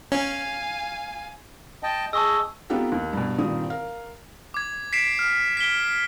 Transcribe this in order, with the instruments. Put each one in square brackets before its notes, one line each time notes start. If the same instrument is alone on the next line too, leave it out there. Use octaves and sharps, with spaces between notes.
[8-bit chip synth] C#4 [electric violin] F5 G#5
[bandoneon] D#5 G5 A5
[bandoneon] G#4 D#5 [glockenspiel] A5 C#6 E6
[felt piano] B3 C4 D#4 F4 G4 A4
D#2
G2 B2
G2 A#2 D#3 C4 D#6
A#4 F5
[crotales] D6 G#6
B6 C7 D7 E7
F6
B6 D7 G7